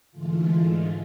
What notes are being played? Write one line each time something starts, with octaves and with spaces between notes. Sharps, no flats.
G#2 D3 E3 G#3 A3 F4